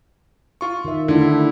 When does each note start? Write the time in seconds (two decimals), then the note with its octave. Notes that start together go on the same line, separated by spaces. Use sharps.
0.61 F4 C#6
0.85 D#3 E5
1.08 D3 A3 E4